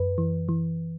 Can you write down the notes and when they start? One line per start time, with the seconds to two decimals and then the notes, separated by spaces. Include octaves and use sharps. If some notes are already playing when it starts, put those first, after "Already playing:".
Already playing: F#2 B4
0.18 E3
0.49 E3